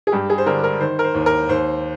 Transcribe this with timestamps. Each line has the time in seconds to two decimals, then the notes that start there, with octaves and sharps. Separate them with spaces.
0.07 G#4
0.12 G2 G4
0.30 G#4
0.38 C5
0.46 D3 A#4
0.64 A#4
0.80 D#3 C5
0.99 A#4
1.04 C5
1.15 D#2
1.26 A#4
1.49 D#2 C5